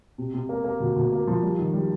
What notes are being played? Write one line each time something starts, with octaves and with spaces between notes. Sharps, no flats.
C3
C3
A#3
A#3
D2
D2
A#3
F3
G3
D#3
G3